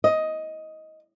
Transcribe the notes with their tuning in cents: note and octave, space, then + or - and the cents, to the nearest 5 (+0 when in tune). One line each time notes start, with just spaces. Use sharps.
D#5 +10